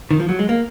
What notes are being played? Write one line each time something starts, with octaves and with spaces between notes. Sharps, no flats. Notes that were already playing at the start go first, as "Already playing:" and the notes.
D#3
F3
F#3
G#3
A#3